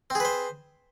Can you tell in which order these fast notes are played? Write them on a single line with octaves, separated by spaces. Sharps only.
C4 G#4 B4 C5